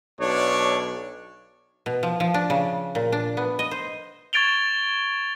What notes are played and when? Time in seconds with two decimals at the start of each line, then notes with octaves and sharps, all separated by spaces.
0.20 B1 D4 C#5
1.86 B2
2.03 F3
2.20 F3
2.34 D4
2.50 C#3
2.95 A#2
3.12 D4
3.37 B3
3.59 D#5
3.71 C5
4.33 C#6 G#6 A6 D7 F7 G7